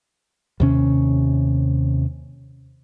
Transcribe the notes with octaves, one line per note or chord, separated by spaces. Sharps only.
D#2 C3 C#4